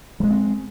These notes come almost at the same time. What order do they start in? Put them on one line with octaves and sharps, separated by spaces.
G3 G#3 A#3 C4